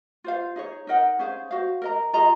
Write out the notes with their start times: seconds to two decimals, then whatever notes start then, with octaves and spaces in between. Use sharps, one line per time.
0.24 F4 C5 F5
0.56 D#4 G#4 C#5
0.87 D#4 A#4 D#5 F#5
1.19 C#4 G#4 C5 F5
1.51 F#4 C5 F5
1.82 A#4 D#5 A#5
2.13 F4 G#4 D#5 A#5